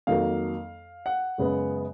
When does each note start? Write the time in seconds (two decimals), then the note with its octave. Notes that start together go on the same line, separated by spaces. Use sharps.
0.07 F2 D#3 F#3 A#3 F5
1.06 F#5
1.38 F#2 C#3 G#3 B3